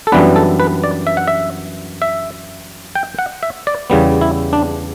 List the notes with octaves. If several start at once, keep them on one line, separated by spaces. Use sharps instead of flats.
A4
F#2 E3 G3 B3 D4 B4
A4
B4
D5
E5
F#5
E5
E5
G5
F#5
E5
D5
E2 C#3 G3 B3
E4
D4